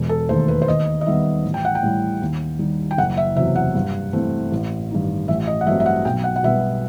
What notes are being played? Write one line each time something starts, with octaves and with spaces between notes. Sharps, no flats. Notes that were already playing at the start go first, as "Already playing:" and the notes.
Already playing: E1
A4
D#2 D#3 A3 C5
B4
C5
D#2 D#5
D#5
D#3 G3 B3 E5
A1
G5
F#5
G5
A2 G3
D#2
D#3 G3
G5
F#1 F#5
E5
E2 C3 F#3 E5
F#5
G2
E3 A3 C4
A1
G2 D#3
A1 E5
D#5
F#5
G2 F#3 A3 C4 E5
E5
F#5
B1 G5
F#5
F#5
B2 G3 B3 E5